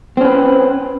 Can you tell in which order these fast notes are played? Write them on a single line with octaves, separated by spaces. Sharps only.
C4 C#4 B4